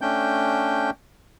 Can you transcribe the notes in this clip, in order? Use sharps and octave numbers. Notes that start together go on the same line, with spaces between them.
A3 C#4 D4 G5 G6